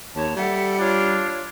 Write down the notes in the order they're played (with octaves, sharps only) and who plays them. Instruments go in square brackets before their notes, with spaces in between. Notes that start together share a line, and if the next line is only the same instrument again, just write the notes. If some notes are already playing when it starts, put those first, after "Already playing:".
[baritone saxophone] D#2 [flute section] C#5 A5
[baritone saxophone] G3 [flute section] A4 E5 F#5
[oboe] D4 [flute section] F4 C#5